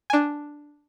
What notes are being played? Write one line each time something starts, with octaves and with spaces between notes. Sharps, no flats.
D4 G#5